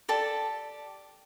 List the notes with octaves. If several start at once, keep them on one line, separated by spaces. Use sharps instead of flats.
G4 A4 D5 A5